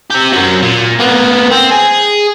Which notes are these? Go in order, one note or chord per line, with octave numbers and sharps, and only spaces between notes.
C4 G4
F#2 F#3
A#2
A#3 B3
C4
G#4